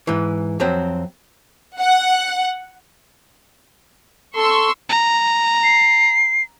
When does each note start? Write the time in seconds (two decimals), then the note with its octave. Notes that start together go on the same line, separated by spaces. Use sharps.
0.07 G#2 E3
0.60 F2 F#3 C4
1.79 F#5
4.36 A4 C6 C#6 E6
4.89 A#5
5.64 C7